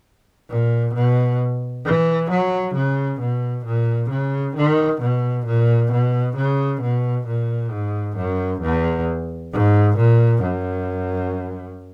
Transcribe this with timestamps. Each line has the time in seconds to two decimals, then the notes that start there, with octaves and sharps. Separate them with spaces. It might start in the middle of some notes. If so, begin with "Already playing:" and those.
0.49 A#2
0.94 B2
1.85 E3
2.30 F#3
2.75 C#3
3.20 B2
3.66 A#2
4.10 C#3
4.56 D#3
5.01 B2
5.46 A#2
5.92 B2
6.36 C#3
6.81 B2
7.27 A#2
7.71 G#2
8.17 F#2
8.62 E2
9.53 G#2
9.97 A#2
10.43 F#2